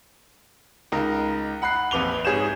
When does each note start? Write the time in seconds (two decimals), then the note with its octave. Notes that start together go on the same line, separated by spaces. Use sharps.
0.92 C#2 D#4 A#4
1.62 F#5 B5 F#6 C7
1.91 A#1 F2 B4 D6 F7 G7
2.25 G#2 G#4 C#5 G6 E7